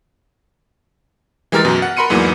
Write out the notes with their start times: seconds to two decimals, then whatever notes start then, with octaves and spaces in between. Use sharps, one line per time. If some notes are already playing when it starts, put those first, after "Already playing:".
1.52 E3 G#3 G4 A#4 F6 A6
1.65 F#2 B2
1.82 F#5
1.97 A#4 B5 C6 C#7 D#7
2.10 E2 G#2 E3 F#3 A#3